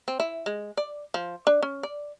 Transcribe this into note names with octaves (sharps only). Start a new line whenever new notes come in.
C4
E4
G#3
D5
F3
D4
C#4
D5